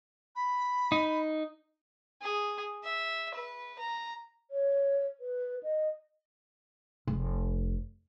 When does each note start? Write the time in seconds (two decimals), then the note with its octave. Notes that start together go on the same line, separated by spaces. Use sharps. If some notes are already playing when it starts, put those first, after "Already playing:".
0.36 B5
0.92 D#4
2.22 G#4
2.84 E5
3.34 B4
3.79 A#5
4.51 C#5
5.20 B4
5.63 D#5
7.07 F1